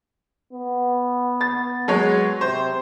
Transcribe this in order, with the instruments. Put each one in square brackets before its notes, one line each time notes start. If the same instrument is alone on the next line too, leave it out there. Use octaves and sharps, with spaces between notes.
[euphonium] B3
[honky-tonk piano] A6
F#3 G#3 C#5
[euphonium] C3 [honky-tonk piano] C5